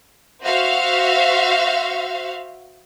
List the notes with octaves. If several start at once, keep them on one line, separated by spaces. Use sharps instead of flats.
F#4 C5 E5 F5